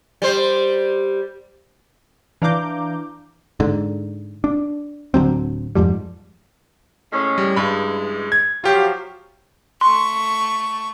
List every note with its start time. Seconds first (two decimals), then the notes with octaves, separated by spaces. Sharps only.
0.22 G3 C5
2.42 E3 D4 F5 A#5 D6 G6
3.60 G#2 D3
4.44 D4
5.14 D1 D3 F#3 C4
5.75 F2 G#2 F3 G3
7.13 A2 G#3 C#4
7.38 G3
7.56 G2 C#3 E3 G#3 B5
8.32 G#6
8.64 F3 F#3 F4 G4
9.81 A3 C6 C#6